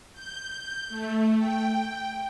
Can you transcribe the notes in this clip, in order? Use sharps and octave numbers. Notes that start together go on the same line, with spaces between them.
G6
A3
G5